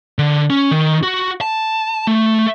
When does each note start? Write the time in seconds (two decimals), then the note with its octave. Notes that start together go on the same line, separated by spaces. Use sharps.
0.19 D3
0.50 C#4
0.71 D#3
1.03 F#4
1.41 A5
2.07 A3